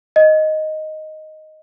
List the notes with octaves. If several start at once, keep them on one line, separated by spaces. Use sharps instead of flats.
D#5